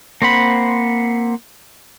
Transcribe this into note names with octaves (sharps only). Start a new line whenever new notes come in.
A#3 C4 C5 F#5 B5